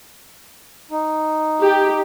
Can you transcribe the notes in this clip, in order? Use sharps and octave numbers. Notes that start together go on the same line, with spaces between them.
D#4
G4